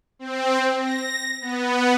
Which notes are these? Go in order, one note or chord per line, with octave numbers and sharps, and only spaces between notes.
C4
A#6
B3